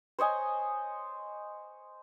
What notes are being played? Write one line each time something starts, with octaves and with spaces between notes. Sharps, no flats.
C5 C#5 D#5 G#5